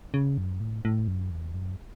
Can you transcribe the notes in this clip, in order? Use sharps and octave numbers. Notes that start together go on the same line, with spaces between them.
C#3
F#2
A2
A2
F#2
E2
F#2